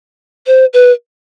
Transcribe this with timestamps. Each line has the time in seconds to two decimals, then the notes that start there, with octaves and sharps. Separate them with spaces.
0.47 C5
0.73 B4